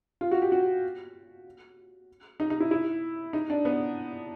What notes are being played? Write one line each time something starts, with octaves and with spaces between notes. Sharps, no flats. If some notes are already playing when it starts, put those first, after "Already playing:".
F4
F#4
G4
F#4
D#4
D#4
E4
E4
D#4
D4
B3